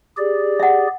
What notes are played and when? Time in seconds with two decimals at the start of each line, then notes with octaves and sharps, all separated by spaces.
0.17 G4 G#4 D5
0.60 E5 F#5